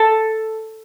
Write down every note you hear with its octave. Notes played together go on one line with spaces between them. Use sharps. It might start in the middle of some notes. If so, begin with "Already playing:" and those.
Already playing: A4